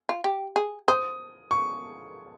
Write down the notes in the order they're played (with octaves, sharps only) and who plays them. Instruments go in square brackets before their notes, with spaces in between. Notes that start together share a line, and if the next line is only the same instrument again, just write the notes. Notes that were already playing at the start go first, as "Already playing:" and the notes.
[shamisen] F4
G4
G#4
[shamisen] C5 [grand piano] D#6
[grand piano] C#6